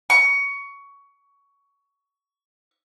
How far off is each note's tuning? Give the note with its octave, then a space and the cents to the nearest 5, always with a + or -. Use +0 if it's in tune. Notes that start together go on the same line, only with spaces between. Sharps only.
C#6 +15